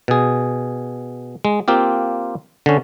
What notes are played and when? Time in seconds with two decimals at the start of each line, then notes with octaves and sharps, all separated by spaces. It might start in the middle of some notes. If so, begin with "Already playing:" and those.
0.08 B2 G#4
1.45 G#3
1.68 A#3 C4 F4 G4
2.66 D3 C#4